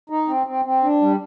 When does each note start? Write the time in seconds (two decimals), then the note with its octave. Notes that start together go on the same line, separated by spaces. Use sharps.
0.10 D#4
0.28 C4
0.47 C4
0.65 C4
0.83 D4
1.01 G3